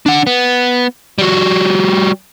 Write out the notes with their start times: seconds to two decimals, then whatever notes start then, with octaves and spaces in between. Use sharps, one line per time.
0.06 D4 F#5
0.27 B3
1.18 G3 F#4